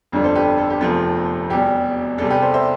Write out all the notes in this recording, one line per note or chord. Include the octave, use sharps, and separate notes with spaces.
G1 F2 D3 G3
A4 C5
G4 B4
A4
G4
F1 E2 C3 F3 A4
E1 E2 B2 G3 G4
E2 C3 G3 A4
G4 B4
A4 C5
C5 E5